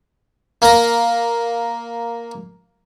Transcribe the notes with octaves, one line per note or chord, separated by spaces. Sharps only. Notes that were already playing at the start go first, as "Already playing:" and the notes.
A#3 A#5